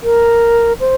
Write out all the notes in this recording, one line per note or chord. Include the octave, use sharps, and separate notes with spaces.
A#4
C5